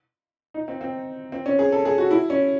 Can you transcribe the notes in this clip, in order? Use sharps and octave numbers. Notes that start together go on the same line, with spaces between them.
D#4
C4
C4
C4
C#4
G#4
A4
G#4
F#4
E4
C#4